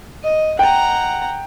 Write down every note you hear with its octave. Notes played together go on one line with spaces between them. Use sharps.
D#5
F#5 G5 A#5